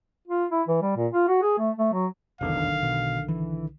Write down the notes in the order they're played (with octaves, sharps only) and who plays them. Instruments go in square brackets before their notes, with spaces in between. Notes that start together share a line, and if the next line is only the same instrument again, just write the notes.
[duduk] F4
E4
E3
G3
A#2
F4
F#4
G#4
A3
A3
F#3
[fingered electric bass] F1 E2 D4 [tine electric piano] B1 D3 D#3 [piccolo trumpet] F5
[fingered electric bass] B2
E3